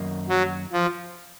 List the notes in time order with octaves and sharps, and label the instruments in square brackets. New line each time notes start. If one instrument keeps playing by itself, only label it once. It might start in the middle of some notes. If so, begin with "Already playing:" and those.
Already playing: [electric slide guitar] F#2 D#3 A#3
[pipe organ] F#3
F3